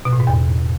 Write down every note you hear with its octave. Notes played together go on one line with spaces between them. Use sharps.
B2
A2
G#2
E2